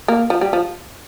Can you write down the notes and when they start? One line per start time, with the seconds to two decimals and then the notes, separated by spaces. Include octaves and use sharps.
0.08 A#3
0.30 F3
0.41 G3
0.53 F3